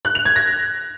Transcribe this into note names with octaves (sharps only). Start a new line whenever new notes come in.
F#6
F7
G#6
A#6